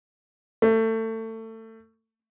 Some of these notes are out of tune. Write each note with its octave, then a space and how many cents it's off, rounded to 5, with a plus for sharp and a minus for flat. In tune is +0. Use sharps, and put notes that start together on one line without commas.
A3 +25